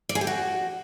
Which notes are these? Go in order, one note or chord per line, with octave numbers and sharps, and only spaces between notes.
D5
G#4
G4
F#4